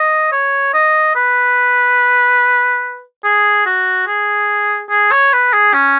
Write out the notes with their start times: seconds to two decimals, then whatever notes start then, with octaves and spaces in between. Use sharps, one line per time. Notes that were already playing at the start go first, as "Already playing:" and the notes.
Already playing: D#5
0.32 C#5
0.74 D#5
1.15 B4
3.24 G#4
3.66 F#4
4.07 G#4
4.90 G#4
5.12 C#5
5.33 B4
5.53 G#4
5.74 C#4